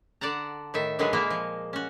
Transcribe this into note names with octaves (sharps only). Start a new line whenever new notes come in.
D3 D5 F#5 A5 A#5
A2 D#3 E5
D3 D#3 F#3 G#3 G#4 B4
A#2 G#3 A#3 E4 E5 F5
F3
C#4 F#4